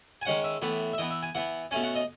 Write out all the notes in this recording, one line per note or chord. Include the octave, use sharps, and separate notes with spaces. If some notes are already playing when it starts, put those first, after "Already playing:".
G#5
D#3 G#3 C#4 F#5
E5
A2 E3 B3
E5
E3 B3 D#5
E5
G#5
E3 B3 F#5
B2 A3 C#4 G#5
F#5
D#5